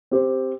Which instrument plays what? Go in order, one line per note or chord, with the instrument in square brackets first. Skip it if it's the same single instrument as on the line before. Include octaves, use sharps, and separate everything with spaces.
[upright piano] C4 G4 C5